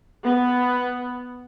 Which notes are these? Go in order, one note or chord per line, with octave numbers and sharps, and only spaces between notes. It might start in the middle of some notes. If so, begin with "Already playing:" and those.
B3